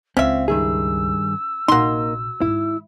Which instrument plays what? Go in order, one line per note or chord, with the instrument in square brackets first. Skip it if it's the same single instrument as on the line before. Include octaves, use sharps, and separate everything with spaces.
[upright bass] C#2 [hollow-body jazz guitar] C4 [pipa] C#4 E5 [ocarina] F5
[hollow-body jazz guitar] G2 D#3 G#4 [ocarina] E6
[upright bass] A#1 C3 [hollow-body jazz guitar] A#3 D#4 [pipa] F#4 C6
[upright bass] G#2 D#3 [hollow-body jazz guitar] E4